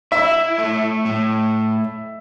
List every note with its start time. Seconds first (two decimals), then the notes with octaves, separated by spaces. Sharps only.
0.12 E4 E5
0.58 A3
1.05 A2